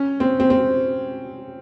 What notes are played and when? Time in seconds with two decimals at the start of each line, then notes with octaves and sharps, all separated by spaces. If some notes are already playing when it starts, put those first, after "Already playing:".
Already playing: C#4
0.20 C4
0.40 C4
0.50 C4